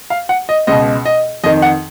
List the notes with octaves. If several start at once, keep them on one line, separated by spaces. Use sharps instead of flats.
F5
F#5
D#5
C#2 B2 D#5
D#5
F2 D#3 D#5
F#5